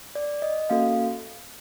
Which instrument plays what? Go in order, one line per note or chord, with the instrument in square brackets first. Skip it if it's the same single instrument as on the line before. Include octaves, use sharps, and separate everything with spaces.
[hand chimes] D5
D#5
A#3 C#4 F#4 A4 F5